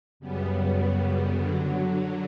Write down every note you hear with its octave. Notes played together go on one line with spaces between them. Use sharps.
F#2 C#3 G3 B3
D3 F#3